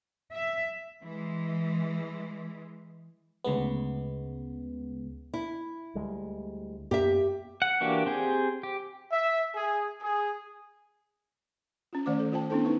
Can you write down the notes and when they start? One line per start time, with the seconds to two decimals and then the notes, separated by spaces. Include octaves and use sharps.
0.31 E5
1.02 E3 G#3
3.44 D2 C#3 G#3 B3
5.34 E4
5.95 D2 G3 G#3
6.91 F#2 A#3 B3 G4 E5
7.62 F#5
7.81 E3 A#3 D4 F#4 G4
8.06 C4 G4 G#4
8.63 G4
9.12 E5
9.55 G#4
10.03 G#4
11.93 C#4 F4
12.06 D#3 A3 C5 D5 D6
12.19 A4
12.32 F4 C5 G5 A5
12.50 B3 C#4 D4 E4 A4 C5
12.65 D#4 B4